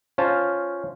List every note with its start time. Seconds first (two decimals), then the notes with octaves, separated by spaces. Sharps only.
0.18 C#4 F4 C5 A5